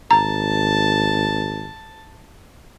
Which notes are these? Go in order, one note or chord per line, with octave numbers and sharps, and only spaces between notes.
G#1 A5 A#5